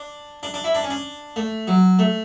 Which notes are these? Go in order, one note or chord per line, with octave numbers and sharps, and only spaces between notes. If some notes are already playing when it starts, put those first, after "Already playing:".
Already playing: D4
D4
D4
E4
D4
C#4
D4
A3
F#3
A3